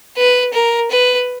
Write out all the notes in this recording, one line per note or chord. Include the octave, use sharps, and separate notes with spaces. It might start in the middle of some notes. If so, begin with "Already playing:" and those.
B4
A#4
B4